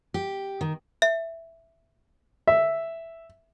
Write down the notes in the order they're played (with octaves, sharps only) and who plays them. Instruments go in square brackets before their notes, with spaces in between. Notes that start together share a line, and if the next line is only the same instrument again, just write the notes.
[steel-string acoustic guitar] G4
D#3
[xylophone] E5
[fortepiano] E5